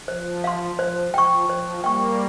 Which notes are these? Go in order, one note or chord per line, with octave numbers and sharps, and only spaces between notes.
F3 C5
F5 C6
F3 C5
F3 G5 C#6
F3 C5
G3 A#3 G5 C#6